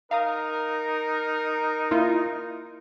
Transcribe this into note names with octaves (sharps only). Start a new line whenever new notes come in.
D#4 A#4 F5 A#5 D#6
A#3 E4 F4